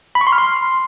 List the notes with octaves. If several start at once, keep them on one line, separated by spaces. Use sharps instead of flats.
B5
C#6
C6
F6
C6